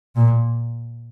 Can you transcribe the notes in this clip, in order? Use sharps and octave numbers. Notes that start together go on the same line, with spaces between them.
A#2